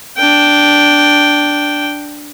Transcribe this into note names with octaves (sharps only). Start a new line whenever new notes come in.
D4 G5